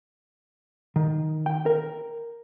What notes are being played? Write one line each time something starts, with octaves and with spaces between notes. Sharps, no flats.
D#3
G5
A#4